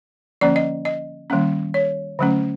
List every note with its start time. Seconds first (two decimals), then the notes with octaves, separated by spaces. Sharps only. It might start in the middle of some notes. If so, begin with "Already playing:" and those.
0.41 D3 F3 A#3 C#4 D5
0.56 D#5
0.85 D#5
1.30 D#3 G3 A#3 C#4
1.74 C#5
2.19 D3 F#3 A3 C#4